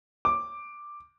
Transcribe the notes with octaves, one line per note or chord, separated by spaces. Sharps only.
D6